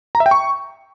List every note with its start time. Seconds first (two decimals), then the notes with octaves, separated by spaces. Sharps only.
0.15 A#5
0.20 E5
0.26 G5
0.31 C#6